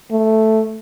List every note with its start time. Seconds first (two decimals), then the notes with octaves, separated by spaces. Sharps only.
0.11 A3